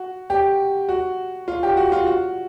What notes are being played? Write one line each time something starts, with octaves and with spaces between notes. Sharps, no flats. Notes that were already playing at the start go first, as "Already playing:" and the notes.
Already playing: F#4
G4
F#4
F4
G4
F#4
F4
F#4